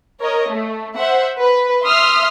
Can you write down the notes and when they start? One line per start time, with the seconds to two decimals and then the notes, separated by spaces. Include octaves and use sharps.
0.21 A#4 C#5 D#5
0.51 A3
0.97 C5 E5 F#5
1.39 B4
1.84 E5 C6 D#6 F6